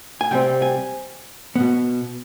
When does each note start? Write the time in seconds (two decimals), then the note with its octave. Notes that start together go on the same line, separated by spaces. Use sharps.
0.21 G#5
0.31 C3 G3 C4 G5
0.62 G#5
1.56 B2 B3